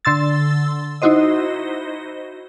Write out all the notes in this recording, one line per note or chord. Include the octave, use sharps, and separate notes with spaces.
D3 C6 E6 A6
D#4 E4 F#4 C5 D#5